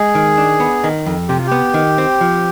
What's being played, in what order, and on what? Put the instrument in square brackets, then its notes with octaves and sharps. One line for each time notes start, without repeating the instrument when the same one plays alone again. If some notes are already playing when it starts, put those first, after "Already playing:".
Already playing: [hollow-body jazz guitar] G#3 [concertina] G#4
[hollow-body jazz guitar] D#3
D4
B3
D#3
F2
[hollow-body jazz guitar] C3 [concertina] G4
[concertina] F4
[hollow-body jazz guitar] B3 [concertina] G4
[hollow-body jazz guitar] D#3
C4
F3